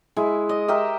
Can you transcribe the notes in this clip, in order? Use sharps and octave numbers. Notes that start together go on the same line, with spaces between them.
G#3 E4
D#5
G4 A#4 D#5 E5